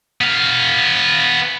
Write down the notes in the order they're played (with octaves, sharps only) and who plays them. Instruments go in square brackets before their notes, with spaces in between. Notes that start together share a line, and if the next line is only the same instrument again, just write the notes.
[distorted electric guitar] B3 F5